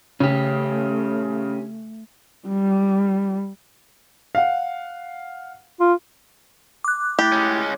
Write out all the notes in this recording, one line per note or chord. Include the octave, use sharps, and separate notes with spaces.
C#3 A3 C#4 G4
G3
F5 F#5
F4
D6 F#6
A3 E4 G4 A6
G#3 C#4